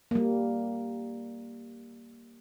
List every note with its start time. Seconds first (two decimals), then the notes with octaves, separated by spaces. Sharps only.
0.11 G3 A#3